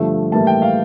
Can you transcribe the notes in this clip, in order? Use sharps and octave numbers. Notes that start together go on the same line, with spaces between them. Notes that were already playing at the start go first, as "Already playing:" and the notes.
Already playing: G2 D3 F3 A3
A2 E3 G3 A#3 A5
G5
F5